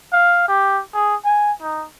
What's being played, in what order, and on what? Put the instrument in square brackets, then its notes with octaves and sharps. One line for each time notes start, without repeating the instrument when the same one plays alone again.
[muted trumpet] F5
G4
G#4
G#5
D#4